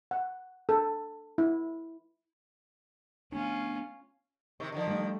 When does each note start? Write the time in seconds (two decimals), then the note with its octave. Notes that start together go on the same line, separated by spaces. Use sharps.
0.11 F#5
0.69 A4
1.38 E4
3.32 A3 B3 C#4 D4 F4
4.60 C3 D#3 C#6
4.72 D3 D#3 F3
4.87 G3 A3